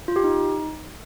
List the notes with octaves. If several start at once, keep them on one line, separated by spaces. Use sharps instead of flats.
F4
G4
D#4